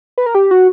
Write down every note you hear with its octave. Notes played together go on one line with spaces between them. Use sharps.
B4
A#4
G4
F#4